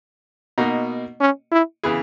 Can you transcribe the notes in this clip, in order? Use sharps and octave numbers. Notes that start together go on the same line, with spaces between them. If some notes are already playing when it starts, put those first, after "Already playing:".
B2 A#3 D#4 F#4
C#4
E4
C#3 E3 B3 E4 G#4